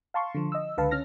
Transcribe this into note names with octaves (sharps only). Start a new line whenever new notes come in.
F5 A5 C6 C#6
D3 F3
D#5 E6
C#2 D3 B4 F5 A5
C#4 F6 A#6